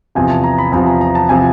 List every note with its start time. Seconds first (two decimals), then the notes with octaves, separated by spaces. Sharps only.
0.15 E2 C3 F3 G#5
0.30 A5
0.44 A#5
0.58 B5
0.72 E2 C3 F3 B5
0.87 A#5
1.01 A#5
1.15 A5
1.29 C3 F3 G#5